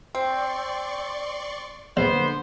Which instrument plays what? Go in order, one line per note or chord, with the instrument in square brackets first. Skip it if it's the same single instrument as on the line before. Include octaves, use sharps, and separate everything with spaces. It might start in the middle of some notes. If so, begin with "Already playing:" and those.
[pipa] C4 [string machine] D5 C6 C#6
[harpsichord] A#1 [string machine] D3 [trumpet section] B3 C5